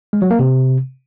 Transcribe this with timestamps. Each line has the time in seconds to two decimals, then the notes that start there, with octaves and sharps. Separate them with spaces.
0.13 G#3
0.22 F#3
0.31 A#3
0.39 C3